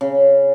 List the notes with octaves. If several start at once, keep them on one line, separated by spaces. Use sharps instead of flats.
C#3